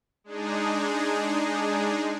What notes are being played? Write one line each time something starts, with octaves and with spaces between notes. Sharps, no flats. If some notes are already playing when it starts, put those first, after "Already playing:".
G#3 D4 D#4 G#4